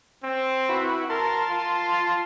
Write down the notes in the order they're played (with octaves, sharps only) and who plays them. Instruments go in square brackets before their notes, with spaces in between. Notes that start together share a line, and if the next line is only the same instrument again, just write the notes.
[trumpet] C4
[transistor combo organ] E4 F#4 B4
[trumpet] A#4 [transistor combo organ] A5 C6
[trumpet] F4